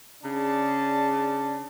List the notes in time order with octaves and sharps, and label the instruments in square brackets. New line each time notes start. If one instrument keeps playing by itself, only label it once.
[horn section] C#3 D4 G#4 D5 A5